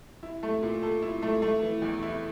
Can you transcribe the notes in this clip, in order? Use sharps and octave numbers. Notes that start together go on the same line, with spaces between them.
E4
A3
A#2
A4
E4
A3
A3
E3
E2
E4